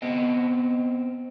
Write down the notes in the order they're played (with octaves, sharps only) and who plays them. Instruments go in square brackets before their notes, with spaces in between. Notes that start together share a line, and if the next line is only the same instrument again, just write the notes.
[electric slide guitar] B3 C4 D#5